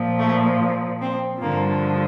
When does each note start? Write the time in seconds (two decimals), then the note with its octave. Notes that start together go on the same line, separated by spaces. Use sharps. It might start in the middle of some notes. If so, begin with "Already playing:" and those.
Already playing: A#2 F3
0.19 A3
1.01 C4
1.41 G2 D3 F3 A#3